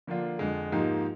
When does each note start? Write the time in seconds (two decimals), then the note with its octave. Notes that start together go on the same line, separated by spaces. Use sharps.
0.07 D3 F3 A#3 D4 F4
0.39 F2 D3 G#3
0.72 G#2 F3 A#3 D#4 G4